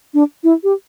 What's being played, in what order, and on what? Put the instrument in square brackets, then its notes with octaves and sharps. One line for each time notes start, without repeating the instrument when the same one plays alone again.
[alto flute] D4
E4
G4